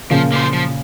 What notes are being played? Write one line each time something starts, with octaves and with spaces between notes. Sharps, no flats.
A#2 C#3 F3
A#3 C#4 F4 C5
F3